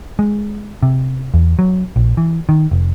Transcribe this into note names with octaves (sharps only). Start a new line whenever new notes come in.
G#3
C3
E2
F#3
A#1
E3
D#3
F1